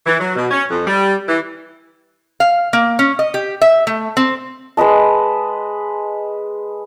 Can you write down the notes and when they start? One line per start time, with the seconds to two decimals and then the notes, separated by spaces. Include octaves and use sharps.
0.06 E3
0.19 F#3
0.36 B2
0.51 C#4
0.70 F2
0.87 G3
1.29 E3
2.40 F5
2.73 A#3
2.99 C#4
3.19 D#5
3.34 G4
3.62 E5
3.87 A3
4.17 C4
4.77 G#3 B4 D#5 A5